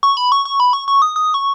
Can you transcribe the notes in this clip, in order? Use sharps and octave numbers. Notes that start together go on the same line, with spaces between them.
C#6
B5
C#6
C#6
B5
C#6
C#6
D#6
D#6
C#6